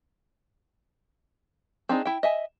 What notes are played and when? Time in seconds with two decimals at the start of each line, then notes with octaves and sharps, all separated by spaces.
1.89 C4 D4 D#4 G#4
2.05 E4 G5
2.23 D#5 E5 G#5